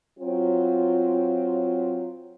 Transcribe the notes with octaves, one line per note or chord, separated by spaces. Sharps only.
F#3 C4 F4